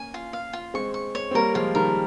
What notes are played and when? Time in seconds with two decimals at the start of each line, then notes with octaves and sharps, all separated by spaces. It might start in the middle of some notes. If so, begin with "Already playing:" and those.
Already playing: A#3 C#4 G#5
0.14 F4
0.33 F5
0.53 F4
0.74 G#3 C4 C#6
0.94 C#6
1.15 C#5
1.31 C4
1.34 G3 A#3 A#4
1.54 F3 G#3 F4
1.75 D#3 G3 A#4